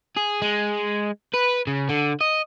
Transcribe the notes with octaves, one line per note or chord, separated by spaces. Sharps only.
G#4
G#3
B4
C#3
D3
D#5